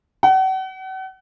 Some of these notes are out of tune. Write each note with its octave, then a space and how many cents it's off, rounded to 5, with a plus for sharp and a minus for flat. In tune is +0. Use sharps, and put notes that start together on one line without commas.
F#5 +40